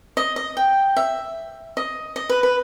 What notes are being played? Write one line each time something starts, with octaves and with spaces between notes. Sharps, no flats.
D#5
D#5
G5
E5
D#5
D#5
B4
B4